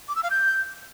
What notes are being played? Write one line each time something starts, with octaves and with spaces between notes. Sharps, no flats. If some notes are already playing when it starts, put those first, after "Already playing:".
D6
E6
F5
G6